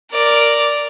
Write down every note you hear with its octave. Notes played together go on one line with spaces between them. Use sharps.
A#4 D5